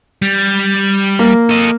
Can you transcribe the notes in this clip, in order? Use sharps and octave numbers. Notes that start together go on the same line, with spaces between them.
G3
A#3
A4 D#5